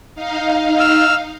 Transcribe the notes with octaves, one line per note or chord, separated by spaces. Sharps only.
D#4 F5
E6 F6